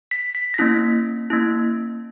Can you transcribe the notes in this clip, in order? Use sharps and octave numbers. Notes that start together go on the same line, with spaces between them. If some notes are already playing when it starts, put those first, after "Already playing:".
B6
B6
A#6
A#3 C#4 E4 B6
A#3 C#4 E4